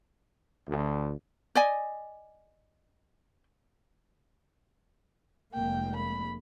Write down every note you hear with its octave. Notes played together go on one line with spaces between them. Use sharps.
D2
D5 D#5 G#5
F1 G#3 A#3 G5
B5